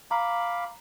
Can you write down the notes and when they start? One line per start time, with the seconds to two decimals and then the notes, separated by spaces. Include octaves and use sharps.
0.11 F5 A#5 B5 D6